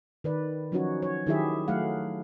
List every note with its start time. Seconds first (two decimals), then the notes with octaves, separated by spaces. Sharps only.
0.24 D#3 B4 D5
0.72 F3 F#3 C#4 D#4 F#4 C#5
1.02 C#5
1.27 D#3 F#3 E4 G4 G#4 E5
1.68 F#3 A3 G#4 F5 F#5